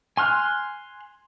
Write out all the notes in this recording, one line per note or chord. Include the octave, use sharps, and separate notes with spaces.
G#5 C6 F6 F#6